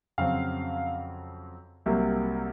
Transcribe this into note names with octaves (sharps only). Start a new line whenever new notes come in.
F2 C#3 F#3 C4 F5
C2 C3 F#3 A#3